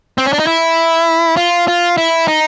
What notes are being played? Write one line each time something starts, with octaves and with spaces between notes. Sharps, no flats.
C4
C#4
D4
D#4
E4
F4
F4
E4
D#4